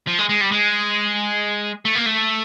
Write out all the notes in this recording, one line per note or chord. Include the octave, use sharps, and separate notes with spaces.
F3
G#3
G#3
G3
G#3
A3
A#3
A3